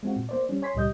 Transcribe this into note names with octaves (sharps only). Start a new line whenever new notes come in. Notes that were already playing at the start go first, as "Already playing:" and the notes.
G#3 C4 F4 F#4
A#2
A#3 C5 D5
G3 C#4
C#5 G#5 C6 B6
C#2 A#2 G3 D#5 G6